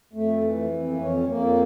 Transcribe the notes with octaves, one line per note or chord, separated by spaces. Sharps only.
F2 A3
E3
F2
A#3
F2 C#4
F2 A#3